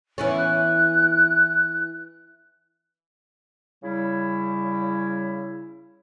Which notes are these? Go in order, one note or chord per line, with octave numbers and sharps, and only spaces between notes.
E3 B3 C#4
F#6
C#3 G3 E4